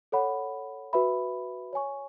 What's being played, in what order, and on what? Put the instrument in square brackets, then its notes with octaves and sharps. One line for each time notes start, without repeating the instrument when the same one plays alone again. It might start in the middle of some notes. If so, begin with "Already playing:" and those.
[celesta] A4 C#5 F#5 B5
F#4 B4 E5 B5
C#5 G#5 C#6